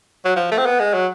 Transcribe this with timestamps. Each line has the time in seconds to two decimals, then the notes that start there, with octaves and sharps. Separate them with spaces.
0.25 F#3
0.36 F3
0.51 A3
0.58 C4
0.66 B3
0.80 G#3
0.94 F#3